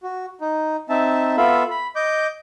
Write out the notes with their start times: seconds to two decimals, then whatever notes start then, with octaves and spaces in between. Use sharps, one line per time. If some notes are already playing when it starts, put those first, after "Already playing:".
0.03 F#4
0.41 D#4
0.89 C4 D#4 E5 A5
1.37 B3 F4 A4 E5 F5 B5
1.71 B5
1.96 D#5 D6 G6